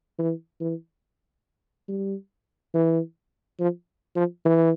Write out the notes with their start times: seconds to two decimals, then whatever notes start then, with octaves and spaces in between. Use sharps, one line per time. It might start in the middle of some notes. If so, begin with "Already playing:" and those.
0.19 E3
0.61 E3
1.89 G3
2.74 E3
3.60 F3
4.16 F3
4.45 E3